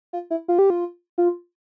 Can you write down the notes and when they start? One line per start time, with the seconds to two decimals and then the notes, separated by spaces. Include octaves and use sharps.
0.13 F4
0.31 E4
0.48 F4
0.59 G4
0.70 F4
1.18 F4